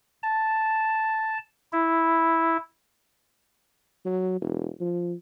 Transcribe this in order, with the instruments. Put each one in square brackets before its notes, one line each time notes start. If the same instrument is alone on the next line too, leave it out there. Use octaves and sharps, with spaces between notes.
[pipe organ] A5
E4
[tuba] F#3
E1
F3